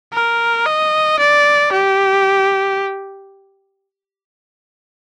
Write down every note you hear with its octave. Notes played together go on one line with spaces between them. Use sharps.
A#4
D#5
D5
G4